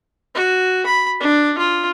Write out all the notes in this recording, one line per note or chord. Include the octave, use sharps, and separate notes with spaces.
F#4
B5
D4
F4